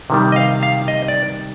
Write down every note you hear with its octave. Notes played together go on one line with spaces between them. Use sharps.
C3 D#3 G3
D#5
F5
F5
D#5
D5